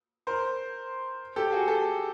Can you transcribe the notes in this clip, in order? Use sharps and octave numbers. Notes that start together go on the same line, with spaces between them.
A#4 C5
G4 A4
F#4 G#4
G4 A4